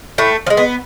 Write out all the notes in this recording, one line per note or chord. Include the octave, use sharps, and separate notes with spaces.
A2 A3
F3
G#3
B3